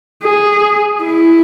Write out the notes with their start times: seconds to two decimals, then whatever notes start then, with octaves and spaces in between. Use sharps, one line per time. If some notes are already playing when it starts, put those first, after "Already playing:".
0.23 G#4
1.03 E4